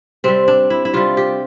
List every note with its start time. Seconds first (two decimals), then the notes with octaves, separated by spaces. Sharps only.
0.24 C3 G3 C4
0.48 D4
0.70 E4
0.85 E4
0.93 C3 G3 F4
1.17 G4